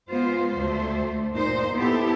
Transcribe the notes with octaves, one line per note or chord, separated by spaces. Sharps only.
G#3 B3 F4 C5
D2 A3 C5
A#2 D#4 C5
B3 E4 G4 A4